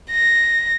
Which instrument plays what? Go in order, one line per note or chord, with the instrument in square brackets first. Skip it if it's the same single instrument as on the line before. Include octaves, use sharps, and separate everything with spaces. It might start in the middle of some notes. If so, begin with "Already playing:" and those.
[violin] A#6